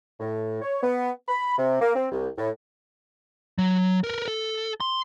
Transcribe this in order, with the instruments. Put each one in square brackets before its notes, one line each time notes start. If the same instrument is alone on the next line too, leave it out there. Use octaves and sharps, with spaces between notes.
[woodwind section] A2
C#5
B3
B5
C3
A#3
C4
C2
A2
[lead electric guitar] F#3
A#4 B4
A4
C6